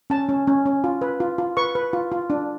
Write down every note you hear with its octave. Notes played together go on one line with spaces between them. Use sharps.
C#4 A5
C#4
C#4
C#4
F4
B4
F4
F4
B4 C#6
B4
F4
F4
D4